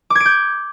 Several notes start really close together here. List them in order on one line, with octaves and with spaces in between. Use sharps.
D6 G#6 D7 G6